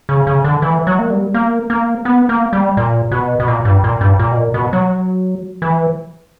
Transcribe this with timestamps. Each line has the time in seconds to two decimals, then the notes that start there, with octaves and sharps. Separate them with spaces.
0.09 C#3
0.27 C#3
0.44 D3
0.62 E3
0.87 F#3
0.99 A#3
1.10 G3
1.34 A#3
1.70 A#3
2.05 B3
2.29 A#3
2.53 G3
2.77 A#2
3.11 B2
3.40 B2
3.48 A#2
3.65 G2
3.84 A#2
4.01 G2
4.19 A#2
4.32 B2
4.36 A#2
4.54 B2
4.73 F#3
5.62 E3